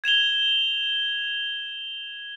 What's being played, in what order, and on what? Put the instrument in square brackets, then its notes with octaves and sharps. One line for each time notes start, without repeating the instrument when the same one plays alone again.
[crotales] G#6 E7 F7 G7